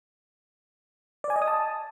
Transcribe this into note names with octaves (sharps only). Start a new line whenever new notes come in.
D5
G#5
D#5
D#6
A5